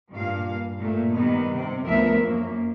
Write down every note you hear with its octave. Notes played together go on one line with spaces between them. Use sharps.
G2 A#2 F5
A#2 A3
D#3 G3 B3 D#4
C3 C4
D2 F3 B3 A#4 E5
F#2 A#3